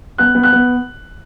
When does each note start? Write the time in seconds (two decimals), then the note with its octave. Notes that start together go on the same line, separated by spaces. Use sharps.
0.18 B3 F#6
0.35 B3
0.43 F#6
0.53 B3